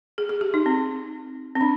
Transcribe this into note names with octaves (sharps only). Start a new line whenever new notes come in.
G#4
G#4
G4
D#4
C4
C4
D4